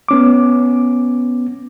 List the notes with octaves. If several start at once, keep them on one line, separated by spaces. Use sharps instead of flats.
B3 C#4 D6